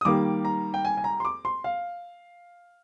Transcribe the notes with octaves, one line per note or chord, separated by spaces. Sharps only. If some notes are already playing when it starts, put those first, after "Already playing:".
D#6
D#3 G3 A#3 D6
A#5
G5
G#5
G#5
A#5
C6
D6
C6
F5